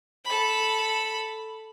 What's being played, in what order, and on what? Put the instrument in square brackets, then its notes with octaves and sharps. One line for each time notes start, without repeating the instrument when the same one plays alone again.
[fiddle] A4 B5